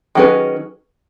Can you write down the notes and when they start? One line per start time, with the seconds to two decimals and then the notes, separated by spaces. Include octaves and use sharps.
0.15 D#3 F#3 C#4 G#4 B4